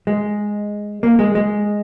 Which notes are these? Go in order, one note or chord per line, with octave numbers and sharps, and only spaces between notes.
G#3
A#3
G#3
G#3